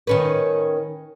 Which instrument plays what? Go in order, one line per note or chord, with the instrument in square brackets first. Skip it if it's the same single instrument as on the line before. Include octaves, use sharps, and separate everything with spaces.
[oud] D#3 C#4 B4